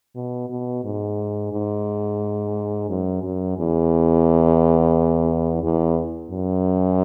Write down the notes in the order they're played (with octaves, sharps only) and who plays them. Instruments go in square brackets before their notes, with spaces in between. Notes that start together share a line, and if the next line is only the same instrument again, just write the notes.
[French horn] B2
B2
G#2
G#2
F#2
F#2
E2
E2
F#2